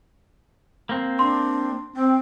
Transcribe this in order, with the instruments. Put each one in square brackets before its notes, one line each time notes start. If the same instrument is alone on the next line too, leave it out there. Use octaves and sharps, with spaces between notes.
[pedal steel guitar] A#3 C4
[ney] D4 [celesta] C6
[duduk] C4 [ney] G5